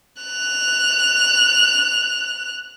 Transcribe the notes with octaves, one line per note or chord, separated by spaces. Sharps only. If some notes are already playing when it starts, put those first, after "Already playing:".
F#6 F7